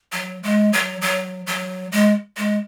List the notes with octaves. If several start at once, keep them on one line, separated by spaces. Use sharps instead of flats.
F#3
G#3
F#3
F#3
F#3
G#3
G#3